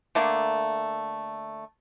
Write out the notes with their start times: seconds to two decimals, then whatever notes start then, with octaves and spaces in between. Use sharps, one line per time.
0.15 D3 A3 A#3